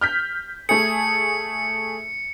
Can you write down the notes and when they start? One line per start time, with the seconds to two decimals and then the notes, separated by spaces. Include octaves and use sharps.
0.01 F6 G6 B6
0.69 A3 G#4 C#7